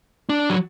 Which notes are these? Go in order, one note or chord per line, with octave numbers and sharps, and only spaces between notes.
D4
F#3